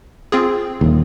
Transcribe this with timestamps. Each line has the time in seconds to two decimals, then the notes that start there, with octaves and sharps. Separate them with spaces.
0.32 C4 F4 G#4
0.81 D#1 D#2